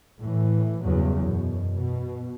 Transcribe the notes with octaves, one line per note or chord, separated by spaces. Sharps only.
A2 E3
E2 G2 C#3 F#3
F#2 B2
B2